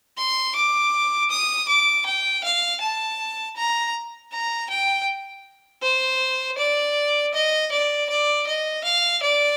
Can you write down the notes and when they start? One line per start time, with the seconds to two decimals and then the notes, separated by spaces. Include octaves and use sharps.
0.18 C6
0.56 D6
1.30 D#6
1.68 D6
2.06 G5
2.44 F5
2.81 A5
3.56 A#5
4.32 A#5
4.70 G5
5.82 C5
6.58 D5
7.34 D#5
7.72 D5
8.09 D5
8.47 D#5
8.84 F5
9.23 D5